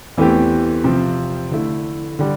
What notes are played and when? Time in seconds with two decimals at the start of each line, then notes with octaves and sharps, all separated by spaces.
0.17 E2 E3 A3 C4 G4
0.84 C3 F3 C4 F4
1.51 D3 A3 E4
2.19 D3 G3